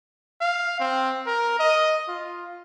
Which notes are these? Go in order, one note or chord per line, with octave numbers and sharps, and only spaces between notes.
F5
C4
A#4
D#5
F4